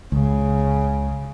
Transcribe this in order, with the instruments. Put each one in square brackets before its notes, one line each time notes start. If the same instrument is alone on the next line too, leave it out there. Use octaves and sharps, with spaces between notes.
[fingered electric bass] C#2 [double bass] C#3